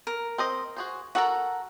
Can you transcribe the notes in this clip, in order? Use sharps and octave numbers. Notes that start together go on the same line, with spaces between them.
A#4
C4 C5 D#5
F#4 G#4 C5
F#4 A4 A#4 F#5 A#5